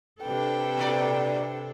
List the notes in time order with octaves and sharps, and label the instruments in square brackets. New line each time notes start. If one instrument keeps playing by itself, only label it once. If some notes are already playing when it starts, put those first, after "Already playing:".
[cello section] C3 D4 A4 [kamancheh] B4 G5
[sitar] A#2 D5